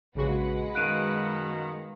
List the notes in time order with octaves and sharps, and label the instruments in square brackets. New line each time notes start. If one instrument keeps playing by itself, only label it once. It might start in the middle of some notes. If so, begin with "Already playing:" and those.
[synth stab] A#1 C#3 F#4 [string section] G#3 B4 F#5
[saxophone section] F#2 B2 D#3 [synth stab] F5 [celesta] F#6 D7 D#7